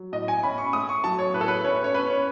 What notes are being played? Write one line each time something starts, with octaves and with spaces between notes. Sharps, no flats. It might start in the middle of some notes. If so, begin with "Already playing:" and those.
Already playing: F#3
A2 D#5
G#5
C#4 B5
C#6
A3 D#6
C#6
F#3 A5
C#5
A2 B4
A4
B4
C#4 C#5
C#5
C#4 B4
C#5